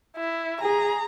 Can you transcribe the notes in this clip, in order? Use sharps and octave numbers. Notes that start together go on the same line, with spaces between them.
E4
G#4 A#5